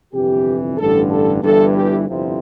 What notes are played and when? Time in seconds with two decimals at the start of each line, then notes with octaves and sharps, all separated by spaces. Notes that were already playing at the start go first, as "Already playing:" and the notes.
0.14 G1 F2 C3 E3 G4
0.78 A1 G2 D3 A4
1.10 A4
1.42 G1 G2 E3 A4
1.74 G4
2.07 G1 F2 C3 F3 E4